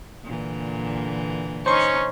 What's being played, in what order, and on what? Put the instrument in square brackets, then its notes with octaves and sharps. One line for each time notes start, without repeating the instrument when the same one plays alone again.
[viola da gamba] A#2 D3 E3
[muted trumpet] C#4 [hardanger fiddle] D#4 C#6 [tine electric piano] C5 C#5 C6